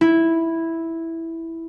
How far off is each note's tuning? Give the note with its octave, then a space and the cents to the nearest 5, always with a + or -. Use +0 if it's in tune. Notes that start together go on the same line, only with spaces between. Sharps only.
E4 -5